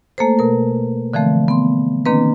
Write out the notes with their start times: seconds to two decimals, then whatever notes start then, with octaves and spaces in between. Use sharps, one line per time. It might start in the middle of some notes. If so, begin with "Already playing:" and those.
0.18 A3 A#3 A4 C5
0.39 B2 A#4
1.14 D3 E3 F3 A3 C4
1.48 B3 C6
2.06 D#3 A#3 C4 D4 B4